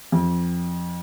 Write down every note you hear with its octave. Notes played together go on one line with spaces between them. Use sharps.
F2